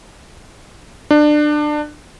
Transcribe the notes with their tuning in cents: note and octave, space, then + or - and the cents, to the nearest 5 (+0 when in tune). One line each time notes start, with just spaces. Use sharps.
D4 +25